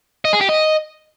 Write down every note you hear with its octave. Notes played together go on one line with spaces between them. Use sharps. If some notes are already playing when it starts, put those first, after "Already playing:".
D#5
G#4
G4
D#5